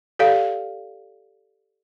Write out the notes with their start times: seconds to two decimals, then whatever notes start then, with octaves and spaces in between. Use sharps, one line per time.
0.19 G4 A4 D5 F5